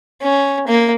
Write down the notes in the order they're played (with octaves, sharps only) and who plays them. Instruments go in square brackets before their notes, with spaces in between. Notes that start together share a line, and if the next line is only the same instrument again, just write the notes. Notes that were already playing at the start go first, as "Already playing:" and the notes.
[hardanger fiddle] C#4
A#3